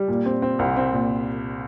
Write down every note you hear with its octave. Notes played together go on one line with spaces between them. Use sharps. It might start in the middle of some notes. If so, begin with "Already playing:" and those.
Already playing: G3
A#2
C4
C4
C2
C4
A#2